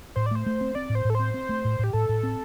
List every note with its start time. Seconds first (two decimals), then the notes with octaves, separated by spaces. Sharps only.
0.16 A2 C5
0.26 D5
0.31 A3 C5
0.46 A3
0.61 C4
0.75 C4 D5
0.90 A2
0.95 C5
1.05 A2 A4
1.15 C4 C5
1.34 C4
1.49 A3
1.65 A2
1.79 A2 G4
1.93 A2 A4
2.09 A2
2.23 C4